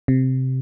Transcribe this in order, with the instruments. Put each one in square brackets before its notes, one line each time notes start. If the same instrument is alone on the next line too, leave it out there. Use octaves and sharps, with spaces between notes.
[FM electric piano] C3